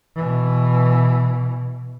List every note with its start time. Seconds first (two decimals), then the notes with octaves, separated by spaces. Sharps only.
0.16 B2 E3